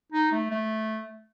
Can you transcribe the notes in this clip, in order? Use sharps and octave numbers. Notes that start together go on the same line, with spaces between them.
D#4
A3
A3